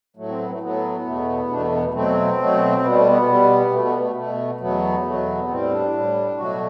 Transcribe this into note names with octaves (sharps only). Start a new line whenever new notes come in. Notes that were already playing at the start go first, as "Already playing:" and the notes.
A2 F#3 A3
C4
B3
A3
A2 F#3 A3 B3
E2 B2 A3
E2 B2 A3 D4
B3
B3
A3
B2 F#3 A3 C4
B2 F#3 A3
B2 G3 B3
A3
B3
B2 G3
B2 A3
B3
A3
B2 A3
E2 B2 F#3 A3 B3
E2 B2 F#3 A3
A2 G3 C4
D4
A2 G3
B2 F#3 A3 F#4